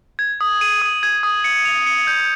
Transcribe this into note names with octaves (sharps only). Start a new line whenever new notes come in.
G#6
D#6
D#7
D#6
G#6
D#6
C#7
F7
C#7
G6